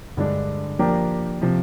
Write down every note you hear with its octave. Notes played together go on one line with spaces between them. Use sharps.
G2 D3 G#3 D4
F3 A#3 D4 G4 A#4
C3 F3